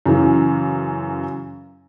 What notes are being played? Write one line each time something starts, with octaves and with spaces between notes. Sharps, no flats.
F#2 C#3 E3